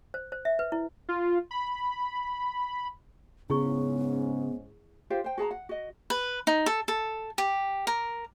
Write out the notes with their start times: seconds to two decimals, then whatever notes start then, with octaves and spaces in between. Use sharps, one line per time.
0.14 C5
0.32 C5
0.45 E5
0.59 B4
0.72 E4
1.09 F4
1.51 B5
3.50 G#2 C#3 B3 C#4 E4 G#4 C#6
5.10 F4 G4 C5 F5
5.24 C5 G5
5.38 F#4 G#4 A5 A#5
5.51 F#5
5.69 F#4 D#5
6.10 B4
6.47 D#4
6.66 A4
6.88 A4
7.38 G4
7.87 A#4